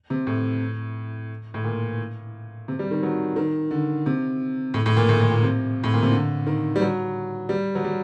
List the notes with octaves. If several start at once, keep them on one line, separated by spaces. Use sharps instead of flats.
C3
A2
A2
A#2
C3
G3
D#3
F#3
D#3
D3
C3
A2
A2
A#2
A2
A2
A#2
C3
A2
A#2
C3
D3
D#3
G3
F#3
G3
F#3
G3